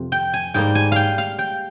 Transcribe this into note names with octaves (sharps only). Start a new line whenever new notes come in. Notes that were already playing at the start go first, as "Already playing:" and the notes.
Already playing: F2 C3
G5
G#5
G#2 G3 A#3 G5
G#5
F5 G5
F5
G5